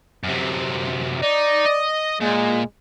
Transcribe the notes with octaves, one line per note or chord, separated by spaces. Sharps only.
F#2 C3
D#4 D5
D#5
A#2 G#3